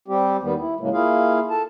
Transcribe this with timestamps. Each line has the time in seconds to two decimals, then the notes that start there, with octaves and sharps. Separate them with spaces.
0.08 G3 C4 G4
0.43 D#2 D#3 G3 B3
0.60 E4
0.80 A2 C#3 F#3 G#3 A#3
0.93 A#3 E4 F4 G#4 F5
1.50 A4 A5